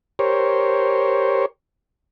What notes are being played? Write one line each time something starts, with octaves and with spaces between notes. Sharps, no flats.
G4 A#4 C5 C#5